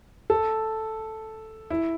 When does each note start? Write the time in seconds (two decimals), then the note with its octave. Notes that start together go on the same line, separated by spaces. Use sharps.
0.30 A4
1.70 E4